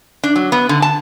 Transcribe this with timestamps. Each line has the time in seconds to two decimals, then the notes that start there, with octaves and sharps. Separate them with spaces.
0.24 D4
0.36 F#3
0.52 B3
0.69 D3
0.82 A5